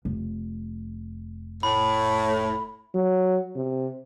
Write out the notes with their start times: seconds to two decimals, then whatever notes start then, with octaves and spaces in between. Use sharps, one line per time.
0.05 F1
1.63 A2 B5
2.94 F#3
3.56 C3